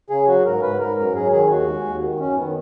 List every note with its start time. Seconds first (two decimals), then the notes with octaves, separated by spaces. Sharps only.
0.10 C#3 G#4
0.27 F#3 F#4
0.45 G#2 A#4
0.62 G#2 B4
0.80 G#2 A#4
0.97 F#2 A#4
1.15 F#3 G#4
1.32 D#3 G#4
1.49 D#2 F#4
1.67 G#3
1.85 D#2
2.03 D#3
2.20 F#2 C#4
2.37 D#3 B3